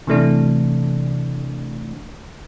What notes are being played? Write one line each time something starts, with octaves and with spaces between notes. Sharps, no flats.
C3 E3 A3 D4